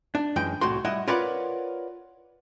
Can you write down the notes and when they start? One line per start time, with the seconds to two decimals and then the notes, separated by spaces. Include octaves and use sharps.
0.15 D4
0.36 F#2 E3 G#3 G5
0.61 C2 A2 F#4 C6
0.85 G3 E4 D#5 F#5
1.07 F4 A#4 B4 C#5 D5 F#5